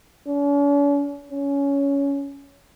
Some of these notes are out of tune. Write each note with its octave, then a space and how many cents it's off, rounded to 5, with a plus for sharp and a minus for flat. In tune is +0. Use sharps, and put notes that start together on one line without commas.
C#4 +45
C#4 +15